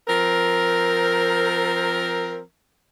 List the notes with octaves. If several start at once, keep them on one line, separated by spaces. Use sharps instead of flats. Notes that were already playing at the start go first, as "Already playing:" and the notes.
F3 C4 A#4